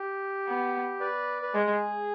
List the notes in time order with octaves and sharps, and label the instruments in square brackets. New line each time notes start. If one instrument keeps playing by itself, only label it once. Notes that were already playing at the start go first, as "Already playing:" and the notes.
Already playing: [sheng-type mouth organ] G4
[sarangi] B3
[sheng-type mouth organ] B4 D5
B4
[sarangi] G#3 [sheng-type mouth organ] G#4